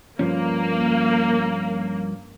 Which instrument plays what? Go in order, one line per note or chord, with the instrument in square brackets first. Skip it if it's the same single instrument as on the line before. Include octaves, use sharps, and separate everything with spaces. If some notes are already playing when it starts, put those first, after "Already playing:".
[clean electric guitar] G2 F3 C#4 [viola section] A#3